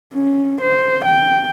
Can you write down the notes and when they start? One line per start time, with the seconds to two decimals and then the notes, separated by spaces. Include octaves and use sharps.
0.14 C#4
0.61 C5
1.05 G5